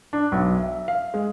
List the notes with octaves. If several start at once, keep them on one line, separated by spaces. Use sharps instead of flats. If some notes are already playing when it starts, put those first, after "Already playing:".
D4
B1
E5
F5
G#3